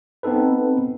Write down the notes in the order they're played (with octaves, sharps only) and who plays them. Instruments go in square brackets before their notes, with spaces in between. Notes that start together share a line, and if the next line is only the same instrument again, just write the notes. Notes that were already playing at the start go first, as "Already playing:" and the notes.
[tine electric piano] B3 C4 D#4 A4 B4